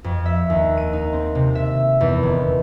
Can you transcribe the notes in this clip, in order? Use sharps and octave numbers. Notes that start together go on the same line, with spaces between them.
F2
E5
D#2
D#7
D#4
C4
C3
E5
E2
D#1